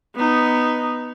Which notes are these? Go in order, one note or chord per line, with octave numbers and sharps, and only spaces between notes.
B3 D#4